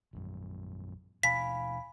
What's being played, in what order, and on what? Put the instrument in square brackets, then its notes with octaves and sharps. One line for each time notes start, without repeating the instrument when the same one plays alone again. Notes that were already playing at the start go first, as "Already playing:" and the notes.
[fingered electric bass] A#1 F#2
[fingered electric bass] D#2 B2 D4 [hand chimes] F5 G#5 B5 [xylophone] B6